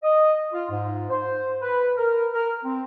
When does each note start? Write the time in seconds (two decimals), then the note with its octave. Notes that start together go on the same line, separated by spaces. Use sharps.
0.03 D#5
0.53 F4
0.70 G#2
1.10 C5
1.62 B4
1.97 A#4
2.33 A#4
2.64 C4